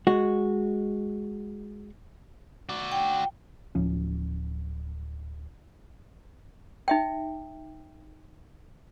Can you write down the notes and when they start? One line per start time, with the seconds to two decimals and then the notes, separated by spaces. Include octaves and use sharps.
0.07 G#3 F#4
2.69 F#4 D5
2.92 G5
3.75 D1 F3 C#4
6.88 D#4 E5 G5